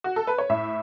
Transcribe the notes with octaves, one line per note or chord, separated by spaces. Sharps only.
F#4
A4
B4
C#5
A2 E5